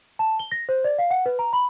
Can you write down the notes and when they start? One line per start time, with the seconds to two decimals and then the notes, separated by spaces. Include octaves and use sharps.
0.19 A5
0.39 G7
0.52 A#6
0.69 C5
0.84 D5
0.98 F5
1.11 F#5
1.26 B4
1.39 A#5
1.53 B5